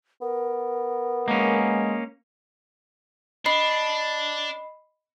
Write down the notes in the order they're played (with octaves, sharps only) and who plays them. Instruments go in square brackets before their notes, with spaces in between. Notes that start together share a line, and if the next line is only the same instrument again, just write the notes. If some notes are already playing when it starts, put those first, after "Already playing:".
[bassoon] B3 [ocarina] A#4
[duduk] G#3 [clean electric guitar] A#3 C#4
[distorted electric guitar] D4 [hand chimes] D#5 B5 C7